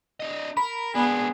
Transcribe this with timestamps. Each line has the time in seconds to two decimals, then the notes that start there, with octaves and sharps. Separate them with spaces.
0.20 D4 D#5
0.57 A#4 B5
0.95 G#3 B3 D4 G#4